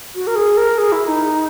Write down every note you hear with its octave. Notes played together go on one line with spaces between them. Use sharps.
F#4
A#4
G#4
A#4
G#4
E4
D#4